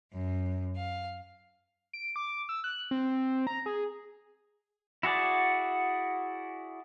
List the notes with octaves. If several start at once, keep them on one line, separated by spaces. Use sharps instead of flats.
F#2
F5
D7
D6
E6
F#6
C4
A#5
G#4
E4 F#4 G#4 D5